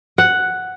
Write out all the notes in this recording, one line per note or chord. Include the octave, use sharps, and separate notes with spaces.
F#5